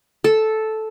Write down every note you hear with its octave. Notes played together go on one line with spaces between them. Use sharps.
A4